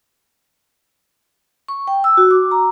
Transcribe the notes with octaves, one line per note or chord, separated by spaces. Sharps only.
C#6
G5
E6
F#4
D6
A#5